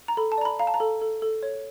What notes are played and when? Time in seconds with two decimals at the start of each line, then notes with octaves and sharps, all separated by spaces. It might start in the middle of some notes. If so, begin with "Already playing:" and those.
0.08 A#5
0.17 A4 B5
0.32 A5
0.38 D5 A#5
0.45 B5
0.59 F5 A#5
0.67 A5
0.74 A#5
0.80 A4
1.02 A4
1.22 A4
1.43 C#5